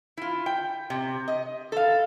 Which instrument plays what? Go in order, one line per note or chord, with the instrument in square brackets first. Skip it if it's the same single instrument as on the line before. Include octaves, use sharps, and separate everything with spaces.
[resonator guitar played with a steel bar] E4 F4
G5
C3
D#5
A4 F5